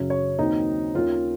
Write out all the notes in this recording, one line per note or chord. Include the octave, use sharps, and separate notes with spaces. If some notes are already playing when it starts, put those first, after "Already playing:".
Already playing: F#2 C#3 F#3 C#4
C#5
D#2 D#3 F#3 C4 D#4
D#2 D#3 A#3 C#4 F4